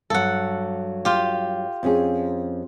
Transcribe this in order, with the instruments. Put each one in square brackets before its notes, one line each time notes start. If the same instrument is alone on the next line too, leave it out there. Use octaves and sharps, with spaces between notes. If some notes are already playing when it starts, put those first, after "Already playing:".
[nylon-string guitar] G2 F#3 [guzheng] A4 F#5
[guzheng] F4 G4
[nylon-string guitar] F2 C#4 G#4